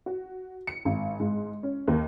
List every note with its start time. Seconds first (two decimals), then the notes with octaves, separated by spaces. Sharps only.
0.06 F#4
0.67 C#7
0.85 G#1
1.20 G#2
1.63 C#4
1.88 D#2